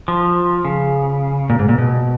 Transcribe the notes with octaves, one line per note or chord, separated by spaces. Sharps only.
F3
C#3
A#2
G#2
A#2
B2